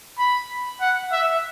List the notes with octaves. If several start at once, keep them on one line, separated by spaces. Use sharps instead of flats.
B5
F#5
E5